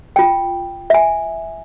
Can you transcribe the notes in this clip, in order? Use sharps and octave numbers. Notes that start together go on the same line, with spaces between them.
F4 G5
E5 G#5